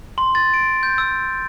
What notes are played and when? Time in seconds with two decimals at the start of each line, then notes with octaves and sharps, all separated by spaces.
0.18 C6
0.35 A6
0.54 D7
0.83 G6
0.98 E6